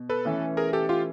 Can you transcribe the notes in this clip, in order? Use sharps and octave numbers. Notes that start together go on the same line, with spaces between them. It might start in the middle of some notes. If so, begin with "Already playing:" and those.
Already playing: B2
A4 B4
E3 A3 C#4
G#4 A#4
G4 A4
F4 G4